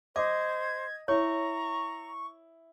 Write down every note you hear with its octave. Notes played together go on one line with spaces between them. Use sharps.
C5 D#5 D6 G#6
E4 C#5 A#5 C#6